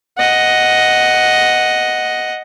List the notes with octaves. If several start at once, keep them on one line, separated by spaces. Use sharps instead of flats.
D#5 F#5